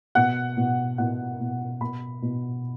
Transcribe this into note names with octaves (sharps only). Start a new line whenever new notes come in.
B2 F#5
B2
B2 F#5
B2
B2 B5
B2